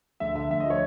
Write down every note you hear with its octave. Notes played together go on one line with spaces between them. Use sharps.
D2 E5
D3 E5
D2 E5
D#5
F3 C#5